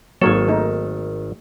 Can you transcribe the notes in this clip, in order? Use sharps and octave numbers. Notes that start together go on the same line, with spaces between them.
G#1 D#3 F#3 A#3 A4 C#5
A3 D#4